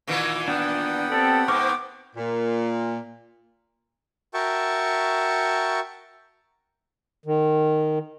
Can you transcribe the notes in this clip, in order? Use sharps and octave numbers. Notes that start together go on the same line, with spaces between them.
A#2 D#3 E3
B3 D4 F#5 G5
C4 G4 A4 D5
G#2 C5 C#6 D6 F6
A#2
F#4 A#4 E5 G5 A5 C#6
D#3